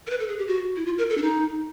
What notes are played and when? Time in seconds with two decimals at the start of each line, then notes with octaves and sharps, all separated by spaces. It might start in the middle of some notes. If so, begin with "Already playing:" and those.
0.07 A#4
0.10 B4
0.20 A4
0.29 G#4
0.39 G4
0.48 F#4
0.76 E4
0.86 F4
0.98 A#4
1.10 A4
1.18 D4
1.22 D#4